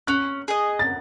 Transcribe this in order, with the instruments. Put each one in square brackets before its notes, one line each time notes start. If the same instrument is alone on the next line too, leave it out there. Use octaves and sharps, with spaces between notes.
[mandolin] C#4 [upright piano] F#6
[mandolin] G#4 D#5
[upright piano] A6